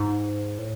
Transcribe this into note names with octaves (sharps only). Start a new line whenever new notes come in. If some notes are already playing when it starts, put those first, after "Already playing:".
Already playing: G#2
A2